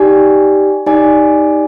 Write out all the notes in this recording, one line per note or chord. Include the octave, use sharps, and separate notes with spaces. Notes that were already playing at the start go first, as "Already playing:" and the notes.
Already playing: D#4 G4 D5 G#5
D#4 G4 D5 G#5